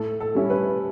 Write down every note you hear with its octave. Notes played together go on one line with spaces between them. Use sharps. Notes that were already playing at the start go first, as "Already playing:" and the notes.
Already playing: A2 A4
A4
G3 C#4 E4
B4